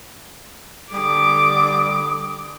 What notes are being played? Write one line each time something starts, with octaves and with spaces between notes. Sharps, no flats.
D3 G3 D6 D#6